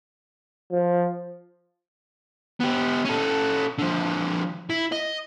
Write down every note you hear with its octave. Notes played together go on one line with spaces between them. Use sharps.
F3
B3 G4
C#4 A4
D3 F3
E4
D#5